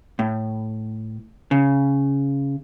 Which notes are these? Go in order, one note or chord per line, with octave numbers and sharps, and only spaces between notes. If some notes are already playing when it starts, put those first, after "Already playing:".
A2
C#3